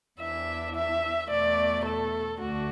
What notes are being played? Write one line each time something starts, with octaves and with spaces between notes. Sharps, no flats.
E2 E3 D4 E5
E5
E2 B2 A3 D5
A4
D2 D3 A3 D4 F#4